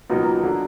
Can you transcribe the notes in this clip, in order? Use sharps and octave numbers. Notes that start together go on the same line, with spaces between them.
C#2 B2 F#3 A#3 D#4
D3 F#3